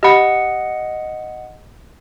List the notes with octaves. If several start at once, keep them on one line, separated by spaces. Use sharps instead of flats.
G4 D#5 F#5 B5